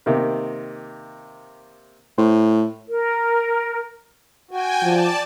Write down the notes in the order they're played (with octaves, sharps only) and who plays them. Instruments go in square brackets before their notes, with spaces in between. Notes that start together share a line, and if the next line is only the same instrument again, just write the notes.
[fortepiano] C3 D#3 A#3
[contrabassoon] A2 [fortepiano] C5
[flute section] A#4
[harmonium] F#4 [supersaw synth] G5 G#5
[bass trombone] F3 [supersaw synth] D5 A5